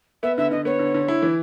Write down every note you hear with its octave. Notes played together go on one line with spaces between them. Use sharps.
B3 E5
D3 E5
D3 D#5
B3 C#5
D3
D3
E4
E3